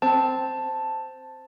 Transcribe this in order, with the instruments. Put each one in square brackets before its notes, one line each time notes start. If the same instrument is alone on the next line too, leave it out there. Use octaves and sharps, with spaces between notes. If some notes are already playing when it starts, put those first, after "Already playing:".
[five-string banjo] C4 [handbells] A5